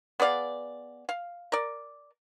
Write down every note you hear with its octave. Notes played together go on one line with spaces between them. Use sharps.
B3 G#4 D5 F5
F5
A#4 D5